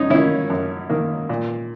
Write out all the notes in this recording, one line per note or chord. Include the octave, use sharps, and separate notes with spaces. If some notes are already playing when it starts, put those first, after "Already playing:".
Already playing: F#2 C#4 D#4
D#3 A#3 C#4 E4
F#2
D#3 A#3
A#2